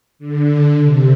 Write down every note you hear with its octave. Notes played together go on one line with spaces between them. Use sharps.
D3
C3